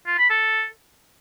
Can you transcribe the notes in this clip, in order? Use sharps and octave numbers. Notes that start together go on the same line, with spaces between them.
F4
B5
A4